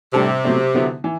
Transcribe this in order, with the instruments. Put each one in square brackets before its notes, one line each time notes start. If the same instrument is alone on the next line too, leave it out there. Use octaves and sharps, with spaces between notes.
[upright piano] A2 G3 D4 A4 [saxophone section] C3
[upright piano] B2 F#3 A3 C4
D3 F#3 B3 E4
E3